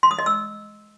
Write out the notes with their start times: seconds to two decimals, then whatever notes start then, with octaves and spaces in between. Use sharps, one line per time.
0.03 C6
0.11 D#6
0.19 D#5
0.26 E6